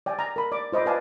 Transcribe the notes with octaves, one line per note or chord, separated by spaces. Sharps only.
D5 G5 G#5
A#5
A#4 B5
D5 D6
F4 C5 D#5 B5 D6
B4 D5 D#5 F5 G#5 A5